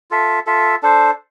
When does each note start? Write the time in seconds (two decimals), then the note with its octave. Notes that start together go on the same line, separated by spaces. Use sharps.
0.11 F4 A4 E5
0.46 F4 A4 E5
0.83 D4 A4 C5